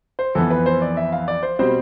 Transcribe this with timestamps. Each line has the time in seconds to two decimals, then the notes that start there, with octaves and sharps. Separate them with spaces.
0.19 C5
0.35 F2 E3 B3 A4
0.51 B4
0.66 C5
0.82 D5
0.97 E5
1.12 F5
1.28 D5
1.43 C5
1.59 B2 G3 C4 C5